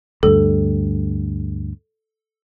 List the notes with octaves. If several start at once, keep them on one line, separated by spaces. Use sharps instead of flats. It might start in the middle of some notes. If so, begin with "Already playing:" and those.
D2 G2 A4